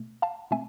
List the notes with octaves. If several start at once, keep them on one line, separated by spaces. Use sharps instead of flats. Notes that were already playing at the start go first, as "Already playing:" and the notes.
Already playing: B2 A3
F5 A5
B2 A3 C4 E5 G#5